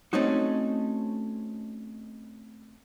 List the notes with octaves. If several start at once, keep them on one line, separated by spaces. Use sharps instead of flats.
A3 C4 C#4 D#4 F#4